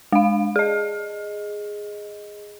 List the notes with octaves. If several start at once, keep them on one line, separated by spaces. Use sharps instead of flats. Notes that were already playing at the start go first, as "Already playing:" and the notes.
G#3 F5
G#4 D#5